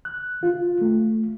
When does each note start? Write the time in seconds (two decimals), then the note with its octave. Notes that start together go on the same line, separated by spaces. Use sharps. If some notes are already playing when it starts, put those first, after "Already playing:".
0.05 F#6
0.43 F4
0.81 A3